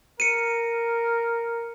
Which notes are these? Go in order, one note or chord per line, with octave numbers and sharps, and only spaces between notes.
A#4 C#7 D#7